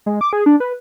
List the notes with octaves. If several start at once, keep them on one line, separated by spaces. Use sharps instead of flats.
G#3
D6
G#4
D4
B4